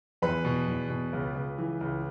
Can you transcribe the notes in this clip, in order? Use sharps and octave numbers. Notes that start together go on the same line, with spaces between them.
E2 B4 B5
B2
E2
B2
C#2
C#2
E3
C#2